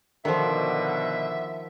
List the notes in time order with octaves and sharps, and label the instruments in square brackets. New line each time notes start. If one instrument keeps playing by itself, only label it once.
[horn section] B2 D3 [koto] D#3 F3 [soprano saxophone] E5